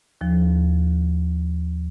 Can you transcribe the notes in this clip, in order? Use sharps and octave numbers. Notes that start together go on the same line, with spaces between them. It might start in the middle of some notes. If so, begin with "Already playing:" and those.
D#2 F3